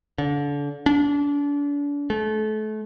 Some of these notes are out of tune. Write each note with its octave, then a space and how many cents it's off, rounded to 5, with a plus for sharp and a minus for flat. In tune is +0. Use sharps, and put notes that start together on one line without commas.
D3 -30
D4 -35
A3 -35